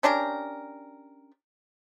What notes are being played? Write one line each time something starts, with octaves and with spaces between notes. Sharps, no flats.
C#4 D4 G4 A#4